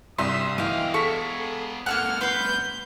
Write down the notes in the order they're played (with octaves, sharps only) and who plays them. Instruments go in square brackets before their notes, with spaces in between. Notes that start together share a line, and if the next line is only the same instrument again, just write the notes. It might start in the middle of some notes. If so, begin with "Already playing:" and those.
[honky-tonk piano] C2 C6 [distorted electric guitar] G2 [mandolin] E5 [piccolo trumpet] D#6
[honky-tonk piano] E3 [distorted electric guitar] B3 F5 [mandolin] D#5 G5 [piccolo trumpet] F6
[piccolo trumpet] G#4 [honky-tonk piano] A4 B6 [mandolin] C#6
[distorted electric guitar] C#2 A#2 [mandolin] A#3 A4 F#6 [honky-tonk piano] F#5 [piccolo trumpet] F6
[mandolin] B4 B5 C6 [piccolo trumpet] G6